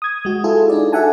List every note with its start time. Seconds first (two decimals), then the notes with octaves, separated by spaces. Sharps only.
0.02 D#6 G#6
0.25 G#3 F#4
0.44 E4 F4 G#4 A4
0.69 D4 D#4 D5
0.92 F#4 A4 E5 F#5 G#5 A5